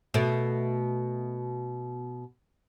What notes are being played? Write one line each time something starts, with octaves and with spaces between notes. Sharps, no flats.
B2 A3